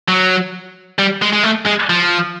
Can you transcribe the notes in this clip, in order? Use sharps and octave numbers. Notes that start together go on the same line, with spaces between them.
F#3
G3
G#3
G#3
A3
G#3
F3